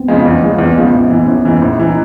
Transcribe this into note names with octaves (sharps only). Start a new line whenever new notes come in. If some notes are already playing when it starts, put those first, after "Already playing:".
Already playing: B3 C4
C#3 F3 G#3
E2
C#3 F3 G#3
E2 B3
C#3 F3 G#3
A#1
G#2 E3
A#1 C#4
G#2 E3
A#1
E3
D#4